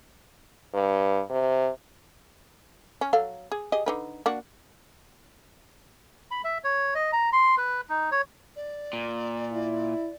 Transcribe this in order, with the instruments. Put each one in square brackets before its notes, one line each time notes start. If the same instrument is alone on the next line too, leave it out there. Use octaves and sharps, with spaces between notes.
[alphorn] G2
C3
[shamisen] C#4
F#3 A4 F5
G#4
G4 G#4 D#5
D3 D#4 B4
A#3 D4 F#4
[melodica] B5
E5
C#5
D#5
A#5
C6
B4
D#4
C#5
[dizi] D5
[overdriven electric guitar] A#2
[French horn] E4